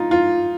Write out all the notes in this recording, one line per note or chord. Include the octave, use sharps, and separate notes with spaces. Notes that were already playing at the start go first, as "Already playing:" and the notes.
Already playing: D#4 F4
F4